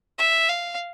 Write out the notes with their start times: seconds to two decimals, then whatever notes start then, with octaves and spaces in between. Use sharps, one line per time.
0.18 E5
0.49 F5